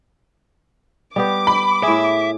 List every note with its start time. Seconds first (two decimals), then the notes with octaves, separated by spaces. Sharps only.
1.16 G3 B3 G4 D6
1.47 B5
1.83 A2 G#4 E5